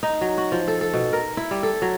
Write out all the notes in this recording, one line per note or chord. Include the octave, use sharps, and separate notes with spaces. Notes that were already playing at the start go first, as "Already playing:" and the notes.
D#4
F#3
F#4
F3
A4
A4
B2
A#4
E4
G3
A4
F#3